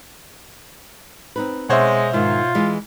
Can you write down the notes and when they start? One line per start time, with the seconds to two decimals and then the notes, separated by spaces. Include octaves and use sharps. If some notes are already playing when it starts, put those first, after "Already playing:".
1.36 C4 D#4 B4
1.70 B2 G#3 C5 C#5 E5 F#5
2.13 G#2 D#3 F4
2.55 E3 G#3